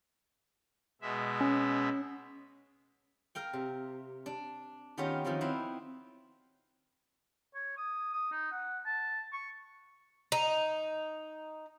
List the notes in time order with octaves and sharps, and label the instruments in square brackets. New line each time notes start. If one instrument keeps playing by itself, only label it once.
[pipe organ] B2 G#3 E5
[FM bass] C#4
[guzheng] A#4 F5 G5
C3
D4
D#3 B3 C#4 F4 G4 A#4
D#3 F3 F#3 C4 C#4
C4 D#4 E4 B4 C5
[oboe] C#5
D#6
D#6
D#4
F#5
A5
C#6
[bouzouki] D#4